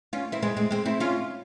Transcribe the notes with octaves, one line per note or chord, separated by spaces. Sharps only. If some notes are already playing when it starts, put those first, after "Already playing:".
C#4 F4
C4 E4
G#3 C4
G#3 C4
G#3 C4
C4 E4
C#4 F4